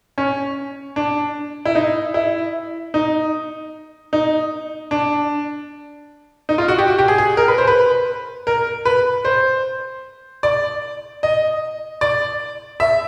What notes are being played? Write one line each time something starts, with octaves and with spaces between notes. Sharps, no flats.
C#4
D4
E4
D#4
E4
D#4
D#4
D4
D#4
F4
F#4
G4
F#4
G4
G#4
G#4
A#4
B4
C5
B4
A#4
B4
C5
D5
D#5
D5
E5